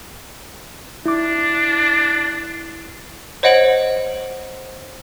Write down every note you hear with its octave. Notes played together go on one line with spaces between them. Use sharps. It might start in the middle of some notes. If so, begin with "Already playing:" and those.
D4 E4 D6
C5 C#5 D#5 F#5 D7 F#7